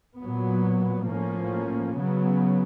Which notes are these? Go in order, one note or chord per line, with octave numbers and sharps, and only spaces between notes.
A#2 F#3 B3
A2 F3 A#3 C#4
C#3 F#3 B3